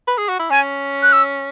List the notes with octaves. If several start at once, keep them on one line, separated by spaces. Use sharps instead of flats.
B4
G#4
F#4
E4
C#4 G#5
F#6
E6